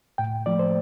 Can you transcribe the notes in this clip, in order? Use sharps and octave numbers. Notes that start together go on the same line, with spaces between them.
A2 G5
F3 A3 D5
C5